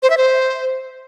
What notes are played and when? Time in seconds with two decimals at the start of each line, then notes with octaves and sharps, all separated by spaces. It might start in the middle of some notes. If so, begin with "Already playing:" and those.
0.03 C5
0.10 E5
0.17 C5